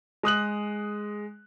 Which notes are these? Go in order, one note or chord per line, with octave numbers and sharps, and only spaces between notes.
G#3 D#6 F#6 F#7